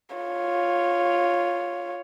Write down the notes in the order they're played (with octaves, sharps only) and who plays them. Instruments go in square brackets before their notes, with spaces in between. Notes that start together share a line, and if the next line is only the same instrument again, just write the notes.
[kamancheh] F4 C#5